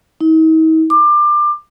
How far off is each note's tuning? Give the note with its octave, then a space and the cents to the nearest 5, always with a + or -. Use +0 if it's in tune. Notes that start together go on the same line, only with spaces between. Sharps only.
D#4 +45
D6 +25